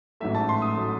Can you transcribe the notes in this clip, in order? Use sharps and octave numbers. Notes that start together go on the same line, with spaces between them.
A1 G#2 F#3 A3 E5
A5
C6
D#6
F#3 A3